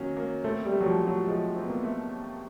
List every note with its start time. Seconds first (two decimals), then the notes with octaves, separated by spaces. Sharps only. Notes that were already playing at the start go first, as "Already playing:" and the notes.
Already playing: D#3 F#3 A#3 C#4
0.16 A#3
0.44 A3 C4
0.65 G3
0.72 A3
0.81 F#3
0.86 F3
1.00 A2
1.07 F#3
1.28 F3 G#3
1.56 C4
1.64 B3
1.70 A#3
1.83 A3